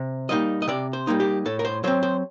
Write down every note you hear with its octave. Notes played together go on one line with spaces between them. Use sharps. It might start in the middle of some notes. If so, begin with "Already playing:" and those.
Already playing: C3
G3 A#3 D#4 D#5
D#5
C3 D5
C5
G3 A#3 D#4
G4
A2 A4
A#4
C5
F#3 C4 C5
C5